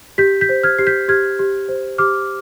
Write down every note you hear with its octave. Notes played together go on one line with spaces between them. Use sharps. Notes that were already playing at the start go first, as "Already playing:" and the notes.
G4 G6 B6
G6 B6
C5
F6 G#6
G4 C7
G6 B6
G4 F6 G#6
G4
C5
G4 D6 F6